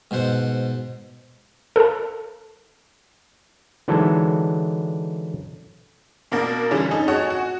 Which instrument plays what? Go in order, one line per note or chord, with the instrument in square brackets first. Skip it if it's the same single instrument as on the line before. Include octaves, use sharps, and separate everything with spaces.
[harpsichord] G#2 B2 C5 F#5
[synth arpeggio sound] A4 A#4 F5 A5
[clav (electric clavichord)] D3 E3 F#3 G#3 D#4 A4
[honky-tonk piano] B2 A#3 D4 A#4
D3 E3 G3 C#4
C#4 D#4 A4
F#4 G#4 A4 C#5 D#5 F#5
F#4